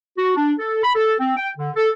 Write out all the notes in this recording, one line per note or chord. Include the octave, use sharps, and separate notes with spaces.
F#4
D4
A4
B5
A4
C4
G5
D3
A4